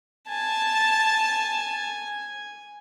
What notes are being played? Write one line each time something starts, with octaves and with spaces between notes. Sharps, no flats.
G#5 A5